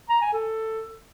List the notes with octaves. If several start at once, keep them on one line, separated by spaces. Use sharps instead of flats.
A#5
G#5
A4